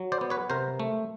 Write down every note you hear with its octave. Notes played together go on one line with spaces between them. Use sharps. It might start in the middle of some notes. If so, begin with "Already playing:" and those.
Already playing: F#3
C5 D5
B3
B4 C#5
C3 A#4 C5
A3